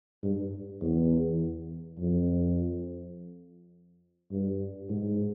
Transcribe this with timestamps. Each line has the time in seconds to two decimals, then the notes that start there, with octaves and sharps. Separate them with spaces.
0.23 G2
0.81 E2
1.99 F2
4.31 G2
4.90 G#2